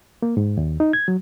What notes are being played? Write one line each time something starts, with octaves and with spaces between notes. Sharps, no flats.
A#3
G#2
D#2
D#4
G#6
F#3